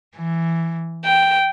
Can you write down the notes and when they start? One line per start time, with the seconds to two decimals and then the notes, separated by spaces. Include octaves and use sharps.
0.15 E3
1.05 G5